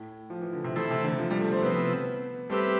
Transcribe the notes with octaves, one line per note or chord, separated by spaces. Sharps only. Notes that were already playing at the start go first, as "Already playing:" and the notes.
Already playing: A2
F3
E3
D3
C3
B2 E3 A3 E4 A4 C5
C3
D3
F3
G3
A3
C4
C3 F3 B3 C4 E4 B4
G3 A3 C4 G4 B4 E5